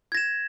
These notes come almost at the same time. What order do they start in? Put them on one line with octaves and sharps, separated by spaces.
G#6 A#6 E7